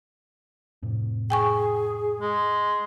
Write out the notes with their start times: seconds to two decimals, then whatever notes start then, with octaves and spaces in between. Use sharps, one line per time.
0.82 F2 A2 C3
1.30 G#4 G5 G#5 C#6
2.21 G#3